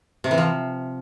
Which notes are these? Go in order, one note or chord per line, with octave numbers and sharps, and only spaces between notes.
C3
E3
F3